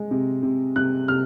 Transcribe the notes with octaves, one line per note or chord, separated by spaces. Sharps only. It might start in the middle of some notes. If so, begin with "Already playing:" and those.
Already playing: G#3
C3
C3
C3 F#6
C3 F6